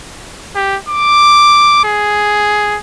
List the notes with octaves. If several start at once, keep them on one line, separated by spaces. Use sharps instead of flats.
G4
D6
G#4